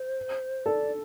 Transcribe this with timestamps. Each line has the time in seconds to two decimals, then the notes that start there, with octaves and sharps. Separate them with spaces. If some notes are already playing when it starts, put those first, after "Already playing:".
Already playing: C5
0.66 A4 D5